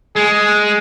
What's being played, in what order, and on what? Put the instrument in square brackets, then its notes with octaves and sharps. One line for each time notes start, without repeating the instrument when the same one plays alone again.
[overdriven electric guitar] G#3 [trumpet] G#4